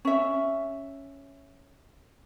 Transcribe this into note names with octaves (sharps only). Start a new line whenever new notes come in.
C#4 E5